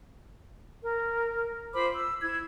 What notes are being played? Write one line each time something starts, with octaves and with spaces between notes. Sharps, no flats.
A#4
F4 C5 B5 D6
E6
E4 G#6